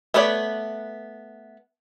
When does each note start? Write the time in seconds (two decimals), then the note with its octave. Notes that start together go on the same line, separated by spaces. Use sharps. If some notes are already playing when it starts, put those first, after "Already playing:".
0.14 A3 B3 B4 C#5 D5